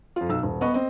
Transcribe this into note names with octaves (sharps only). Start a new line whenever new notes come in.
F2 F4
B1 E6
D#1
B3 D#5 C#6
C4 D#5